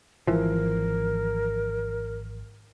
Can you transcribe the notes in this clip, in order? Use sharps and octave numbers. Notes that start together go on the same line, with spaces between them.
G#1 E3 F3 A#4